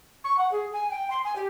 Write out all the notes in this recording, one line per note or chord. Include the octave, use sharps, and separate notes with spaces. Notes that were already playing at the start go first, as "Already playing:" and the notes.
C#6
F#5
G#4
G#5
G5
C6
G#5
G4